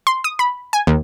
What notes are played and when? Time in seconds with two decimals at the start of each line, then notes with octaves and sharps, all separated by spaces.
0.07 C6
0.24 D#6
0.39 B5
0.73 G#5
0.87 D#2